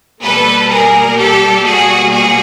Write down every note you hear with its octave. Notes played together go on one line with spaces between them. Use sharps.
B2 G3 A#3 A4 B4
G#4 A#4
G4 A4
F#4 G#4
F#4 G#4